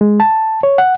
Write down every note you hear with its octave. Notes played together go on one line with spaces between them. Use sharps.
G#3
A5
C#5
F#5